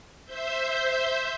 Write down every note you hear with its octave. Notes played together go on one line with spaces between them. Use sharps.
C5 E5 G6